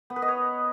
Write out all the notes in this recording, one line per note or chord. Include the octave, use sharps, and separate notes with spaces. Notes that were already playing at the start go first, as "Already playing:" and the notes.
B3
B4
D#5
C#5